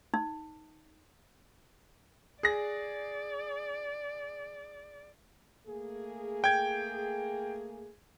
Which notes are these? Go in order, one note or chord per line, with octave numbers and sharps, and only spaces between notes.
D#4
G#4 D5 A#6
A3 A#3 G#4
G5 G#6